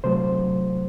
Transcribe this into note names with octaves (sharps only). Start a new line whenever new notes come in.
C3 F#3 A3 C5